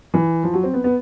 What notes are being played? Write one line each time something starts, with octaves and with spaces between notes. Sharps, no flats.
E3
F3
F#3
C4
B3
B3